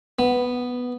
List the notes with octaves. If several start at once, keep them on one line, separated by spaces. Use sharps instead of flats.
B3